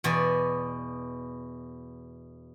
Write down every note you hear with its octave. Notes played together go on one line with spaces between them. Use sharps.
E2 B2 D5